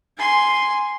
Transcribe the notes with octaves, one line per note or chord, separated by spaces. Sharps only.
G#5 C6